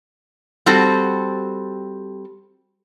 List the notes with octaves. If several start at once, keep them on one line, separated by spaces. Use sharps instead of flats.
G3 C4 F#4 A4